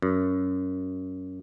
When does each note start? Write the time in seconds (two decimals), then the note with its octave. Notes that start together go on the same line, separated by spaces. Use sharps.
0.02 F#2